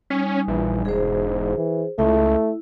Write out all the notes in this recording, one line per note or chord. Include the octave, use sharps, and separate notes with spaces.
G3 C#4 D#4 G#5
A#1 E3
E1 G#2 G#4 C5
E3
C#2 A3 E4